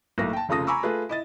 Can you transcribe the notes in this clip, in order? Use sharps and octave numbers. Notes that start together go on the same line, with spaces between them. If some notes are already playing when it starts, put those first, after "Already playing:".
B1 A2 A#3 A#6
G5 A5
F1 C#3 F4 A4 D#6 A#6
G#5 A#5 B5 C#6 D6 E6
A3 F4 G#4 B4
E4 D#5 A6